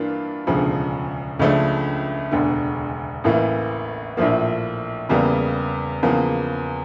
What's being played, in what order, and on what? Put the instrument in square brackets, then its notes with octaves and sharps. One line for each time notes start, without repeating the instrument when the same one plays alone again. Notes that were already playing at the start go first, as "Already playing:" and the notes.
Already playing: [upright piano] G2 E3 A#3 D4 F4
E1 D2 C#3 F3
C#2 C#3 F3 A3 D4
E1 D2 D3
A1 A2 E3 A#3
A#1 A2 F3 A#3
E2 C#3 G3 A#3
E2 C#3 F3 A#3